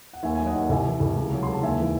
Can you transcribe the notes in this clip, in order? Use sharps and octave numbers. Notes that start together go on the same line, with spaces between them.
F#5
D#2 E5 G#5
F#3 G#5
D#5 F#5
D#2
C2 E5 G#5
E3
C2
C#2
F#3
C#2 C6
A5
D#2 E5 G#5
E3